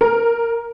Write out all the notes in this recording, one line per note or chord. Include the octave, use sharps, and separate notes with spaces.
A#4